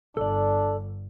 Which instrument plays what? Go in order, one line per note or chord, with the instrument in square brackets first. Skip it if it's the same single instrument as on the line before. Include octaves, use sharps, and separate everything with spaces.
[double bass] G1 [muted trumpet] D4 [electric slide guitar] A4 D5